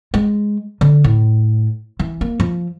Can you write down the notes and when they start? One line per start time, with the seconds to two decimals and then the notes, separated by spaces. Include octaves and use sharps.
0.14 G#3
0.81 D3
1.04 A2
1.99 E3
2.21 A#3
2.40 F3